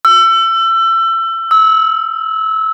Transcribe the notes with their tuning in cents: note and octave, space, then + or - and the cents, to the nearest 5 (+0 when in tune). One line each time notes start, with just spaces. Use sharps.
E6 +30
E6 -25